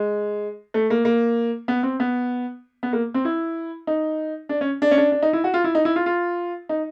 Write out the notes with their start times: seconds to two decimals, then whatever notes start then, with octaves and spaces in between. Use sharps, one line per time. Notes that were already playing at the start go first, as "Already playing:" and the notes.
Already playing: G#3
0.74 A3
0.90 A#3
1.05 A#3
1.68 B3
1.83 C4
2.00 B3
2.83 B3
2.93 A#3
3.14 C4
3.25 E4
3.87 D#4
4.49 D4
4.61 C#4
4.82 D4
4.91 C#4
4.97 D4
5.12 D4
5.22 D#4
5.33 E4
5.44 F#4
5.54 F4
5.64 E4
5.75 D#4
5.85 E4
5.96 F4
6.06 F4
6.69 D#4